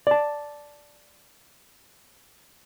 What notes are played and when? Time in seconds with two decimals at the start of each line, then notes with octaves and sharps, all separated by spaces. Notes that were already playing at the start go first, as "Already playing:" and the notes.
0.07 D5 A5